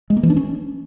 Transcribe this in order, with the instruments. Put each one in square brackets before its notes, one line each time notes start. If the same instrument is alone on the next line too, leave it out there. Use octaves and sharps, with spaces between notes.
[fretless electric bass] G#3
A#3
E3
D4
C#4